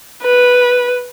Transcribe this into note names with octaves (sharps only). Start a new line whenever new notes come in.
B4